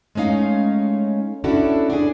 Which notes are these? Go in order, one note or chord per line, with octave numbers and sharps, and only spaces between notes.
G#3 A3 C#4 D#4 F5
C#4 D4 E4 F#4 A4
D4 G#4